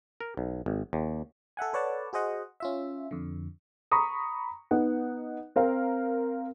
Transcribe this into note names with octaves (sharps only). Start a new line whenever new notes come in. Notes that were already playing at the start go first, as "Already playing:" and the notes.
A#4
B1
G#1
D#2
A4 E5 F#5 G#5
A4 B4 C#5 D5 F#5 A5
F#4 G#4 C5 D#5 F#5
C#4 F4 E5
F2 D3
A#5 B5 C#6 D#6
B3 D#4 F#5
C4 A#4 F5